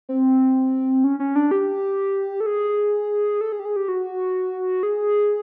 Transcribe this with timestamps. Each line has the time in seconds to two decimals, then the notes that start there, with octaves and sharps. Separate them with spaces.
0.09 C4
1.04 C#4
1.20 C#4
1.36 D4
1.51 G4
2.40 A4
2.46 G#4
3.41 A4
3.52 G#4
3.60 G4
3.65 G#4
3.76 G4
3.88 F#4
4.83 G#4